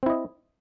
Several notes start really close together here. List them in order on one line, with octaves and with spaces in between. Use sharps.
C4 E4 D#5